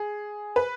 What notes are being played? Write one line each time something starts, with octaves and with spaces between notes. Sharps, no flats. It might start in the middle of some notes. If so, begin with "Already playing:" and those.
Already playing: G#4
B4